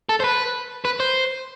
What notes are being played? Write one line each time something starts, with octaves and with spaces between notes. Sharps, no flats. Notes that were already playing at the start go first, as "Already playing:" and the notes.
A4
C5
B4
B4
C5